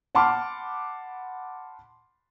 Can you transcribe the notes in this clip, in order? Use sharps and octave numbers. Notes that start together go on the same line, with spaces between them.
F#5 A5 B5 C6 D6 F6